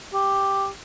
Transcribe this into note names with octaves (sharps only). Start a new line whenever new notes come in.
G4